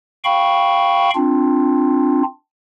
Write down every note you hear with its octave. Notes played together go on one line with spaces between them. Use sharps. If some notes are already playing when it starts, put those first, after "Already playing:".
F5 G5 B5 C#6
C4 D4 F4